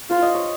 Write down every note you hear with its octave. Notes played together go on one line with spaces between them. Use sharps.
F4 C5
D#5
C#5